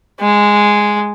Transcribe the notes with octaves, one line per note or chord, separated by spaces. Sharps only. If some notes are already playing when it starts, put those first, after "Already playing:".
G#3